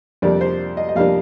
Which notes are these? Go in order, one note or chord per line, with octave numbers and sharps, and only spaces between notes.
F2 C3 G3 A#3 D4 D5
C5
D#5
D#5
F2 C3 G3 A#3 D4 F5